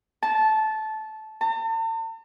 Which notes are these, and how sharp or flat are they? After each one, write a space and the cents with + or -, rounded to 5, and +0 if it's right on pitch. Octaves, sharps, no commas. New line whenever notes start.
A5 -15
A5 +45